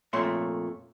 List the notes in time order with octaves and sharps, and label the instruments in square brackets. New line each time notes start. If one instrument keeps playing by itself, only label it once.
[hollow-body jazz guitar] F2 A#2 A3 C#5 C6